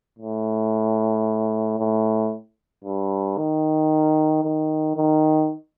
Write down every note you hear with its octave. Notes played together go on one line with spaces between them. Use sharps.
A2
A2
G2
D#3
D#3
D#3